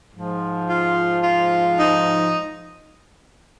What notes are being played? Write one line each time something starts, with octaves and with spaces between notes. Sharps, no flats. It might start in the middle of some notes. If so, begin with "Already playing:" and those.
G#2 F3
F4
F4
D#4